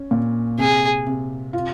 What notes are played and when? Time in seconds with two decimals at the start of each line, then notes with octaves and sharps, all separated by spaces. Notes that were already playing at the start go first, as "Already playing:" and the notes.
Already playing: C#4
0.11 A#2
0.58 C3 G#4
1.07 C3
1.53 F4